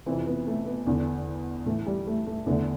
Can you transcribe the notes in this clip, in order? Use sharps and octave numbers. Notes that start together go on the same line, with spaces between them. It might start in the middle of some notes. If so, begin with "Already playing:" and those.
F2 C3 E3 C4
B3
A3
B3
E2 D3
A2 E3 A3
G3
A3
A3
E2 D3 A3